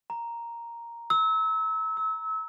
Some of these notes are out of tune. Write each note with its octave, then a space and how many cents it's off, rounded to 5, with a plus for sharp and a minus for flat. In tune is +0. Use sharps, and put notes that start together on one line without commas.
A#5 +0
E6 -30
E6 -35